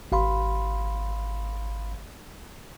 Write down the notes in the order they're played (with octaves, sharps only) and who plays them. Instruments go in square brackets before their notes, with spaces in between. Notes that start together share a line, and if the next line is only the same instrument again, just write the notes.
[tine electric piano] G#1 F5 B5 C6